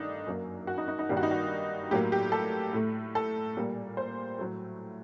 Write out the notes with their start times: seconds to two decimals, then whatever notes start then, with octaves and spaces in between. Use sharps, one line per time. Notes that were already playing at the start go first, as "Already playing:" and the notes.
Already playing: G2 D#3 A3 D4 D#4
0.27 F#2 F#3 A#3
0.67 F#4
0.78 D#4
0.88 D#4
0.99 D#4
1.09 G2 D#3 G3 A#3 G4
1.17 F#4
1.23 D#4
1.31 F#4
1.91 A2 F#3 A#3 G4
2.12 G4
2.32 A4
2.73 A2 A3
3.15 A4
3.57 A#2 G3 A#3
3.97 C5
4.38 A2 F#3 A3